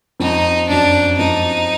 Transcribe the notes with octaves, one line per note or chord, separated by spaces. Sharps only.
F2 D#4
F#2 D4
F2 D#4